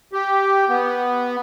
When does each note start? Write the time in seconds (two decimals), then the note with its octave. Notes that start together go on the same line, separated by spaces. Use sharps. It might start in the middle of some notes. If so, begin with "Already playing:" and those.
0.13 G4
0.69 B3